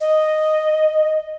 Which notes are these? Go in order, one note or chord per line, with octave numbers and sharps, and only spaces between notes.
D#5